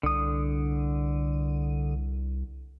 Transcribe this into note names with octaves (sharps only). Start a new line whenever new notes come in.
C2 D3 D#6